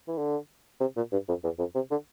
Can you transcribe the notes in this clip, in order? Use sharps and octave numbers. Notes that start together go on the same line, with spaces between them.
E3
D3
C3
A#2
G2
F2
E2
F2
C3
D3